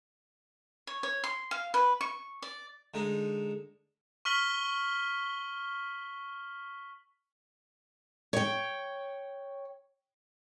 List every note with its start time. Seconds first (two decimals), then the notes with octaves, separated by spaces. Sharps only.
0.87 C#5
1.03 C#5
1.24 C6
1.51 F5
1.74 B4
2.01 C#6
2.42 D5
2.94 D3 G#3 D#4
4.25 C#6 F6 B6 F#7 G7
8.33 C#5 G5